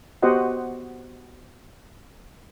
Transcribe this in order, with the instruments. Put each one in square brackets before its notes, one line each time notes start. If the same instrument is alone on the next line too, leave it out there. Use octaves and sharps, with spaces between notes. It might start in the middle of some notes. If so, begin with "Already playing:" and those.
[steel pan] B3 F#4 G4 C5 D#5 F#5